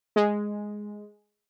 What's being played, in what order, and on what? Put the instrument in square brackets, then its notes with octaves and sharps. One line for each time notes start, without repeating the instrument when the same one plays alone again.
[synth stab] G#3